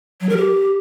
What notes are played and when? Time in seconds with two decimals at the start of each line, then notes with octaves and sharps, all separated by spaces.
0.21 F#3
0.29 A#4
0.37 G4